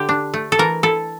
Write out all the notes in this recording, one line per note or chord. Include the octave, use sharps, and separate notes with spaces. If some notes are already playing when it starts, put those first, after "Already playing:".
Already playing: D3 G4
D4
A3
A4
E3 A#4
E4 A4